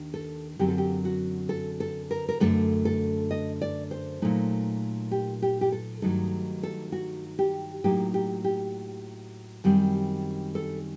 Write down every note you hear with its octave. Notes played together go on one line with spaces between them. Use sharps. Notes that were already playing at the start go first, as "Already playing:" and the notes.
Already playing: D#2 D#3 D4
A4
F#2 D3 F#3 C4 G4
A4
G4
F#4
A4
A4
A#4
A#4
F#2 D3 A3 D4 A4
A4
D#5
D5
C5
A#2 F#3 A3 D#4
G4
G4
G4
A4
G2 D#3 F#3 A3 D#4 A4
A4
F#4
G4
A2 F#3 A#3 D#4 G4
G4
G4
F#2 D#3 G3 C4
A4